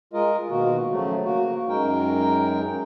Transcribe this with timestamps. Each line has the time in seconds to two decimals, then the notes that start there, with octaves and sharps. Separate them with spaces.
0.13 G#3 F4 A#4 D#5
0.50 B2 D#3 A#3 F#4
0.90 C#3 F3 F#3 A3
1.25 A#3 F#4
1.69 F#2 G#3 D#4 A#4 G5